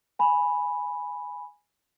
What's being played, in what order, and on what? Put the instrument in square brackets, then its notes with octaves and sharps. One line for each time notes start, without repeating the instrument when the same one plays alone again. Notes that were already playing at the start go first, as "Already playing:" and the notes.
[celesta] G#5 B5